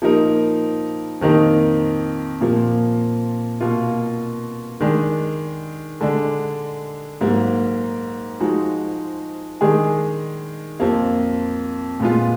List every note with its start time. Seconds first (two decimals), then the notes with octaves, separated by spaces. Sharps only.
0.02 F3 A#3 D#4 A#4
1.21 F2 D#3 A#3 D#4 A#4
2.41 A#2 F3 A#3
3.61 B2 A#3 F4
4.80 D#3 G#3 D4
6.01 D3 G#3 D4
7.21 G#2 F#3 A#3
8.40 F3 G#3 D#4 F#4
9.61 D#3 G#3 D4 G#4
10.80 F2 F3 A#3
12.00 A#2 G#3 B3 F4